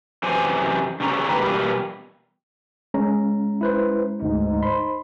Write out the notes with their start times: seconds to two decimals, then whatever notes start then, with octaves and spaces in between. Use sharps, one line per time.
0.23 F#2 C3 E3 G4 C5 G#5
1.00 E2 C#3 C#4 G4 A#5
1.29 E2 B2 G3 A#3 G4 B4
2.94 G#3 C#4 A#5
3.61 E4 B4 C5
4.22 D2 G#2 D#4
4.63 C5 B5 C6